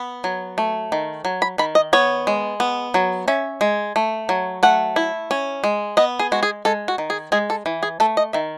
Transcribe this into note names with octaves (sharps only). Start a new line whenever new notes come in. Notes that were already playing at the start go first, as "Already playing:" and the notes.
Already playing: B3 B5
F#3
A3
D#3
F#3
B5
D#3 B5
D#5
B3 C#5
G#3
B3
F#3
C#4 E5
G#3
A3
F#3
A3 F#5
E4
C#4
G#3
B3 D#5
G#4
G#3 F#4
G#4
G#3 A4
F#4
D#3
G#4
G#3 G#4
A4
E3
G#4
A3 A4
D#5
D#3 E5